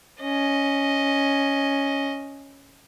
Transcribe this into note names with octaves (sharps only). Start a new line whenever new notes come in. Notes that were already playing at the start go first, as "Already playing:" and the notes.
C#4 D#5